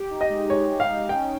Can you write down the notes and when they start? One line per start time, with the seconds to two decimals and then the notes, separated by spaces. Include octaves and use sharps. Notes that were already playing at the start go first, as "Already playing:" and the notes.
Already playing: G4
0.11 D#4
0.21 D#5
0.30 G#3
0.50 G#3 C#5
0.70 G4
0.80 F5
0.89 D#4
1.09 C#4 G5